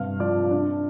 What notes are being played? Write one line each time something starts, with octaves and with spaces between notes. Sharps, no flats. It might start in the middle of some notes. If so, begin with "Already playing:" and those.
Already playing: G2 C3 F5 F6
F3 D5 D6
D4